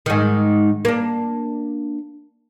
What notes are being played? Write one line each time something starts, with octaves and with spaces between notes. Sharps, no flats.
G#2 D#3
A#3 D4